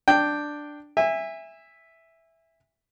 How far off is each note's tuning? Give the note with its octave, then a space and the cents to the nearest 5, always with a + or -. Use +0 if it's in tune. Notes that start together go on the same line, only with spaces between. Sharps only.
D4 +5 G5 +0
E5 +0 G#5 -30